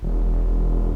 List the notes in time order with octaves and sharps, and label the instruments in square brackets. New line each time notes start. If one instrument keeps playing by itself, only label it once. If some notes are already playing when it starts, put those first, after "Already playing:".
[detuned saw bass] E1